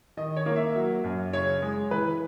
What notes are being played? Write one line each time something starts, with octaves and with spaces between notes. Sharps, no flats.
D#3 D#5
C#5
A#3
E5
F#3
F#2
C#3 C#5
G#3
E3 B4